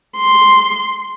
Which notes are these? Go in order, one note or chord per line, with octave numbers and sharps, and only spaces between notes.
C6